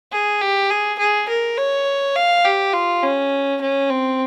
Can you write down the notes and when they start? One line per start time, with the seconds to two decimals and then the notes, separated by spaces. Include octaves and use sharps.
0.12 G#4
0.41 G4
0.70 G#4
0.99 G#4
1.29 A#4
1.57 C#5
2.16 F5
2.45 G4
2.73 F4
3.03 C#4
3.61 C#4
3.90 C4